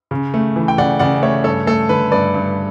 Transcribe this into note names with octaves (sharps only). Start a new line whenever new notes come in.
C#3
A3
E3
G5
C#3 D5 F#5
C#3 D5 F#5
A3 C#5 E5
G2 A4 C#5
A3 A4
D3 B4
G2 B4 D5
G2